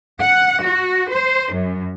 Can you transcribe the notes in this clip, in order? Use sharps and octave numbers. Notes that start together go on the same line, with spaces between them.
F#5
F#4
C5
F#2